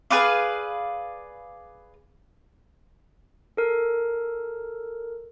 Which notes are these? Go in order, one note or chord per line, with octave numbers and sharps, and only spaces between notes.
G#4 B4 D5 F5
A4 A#4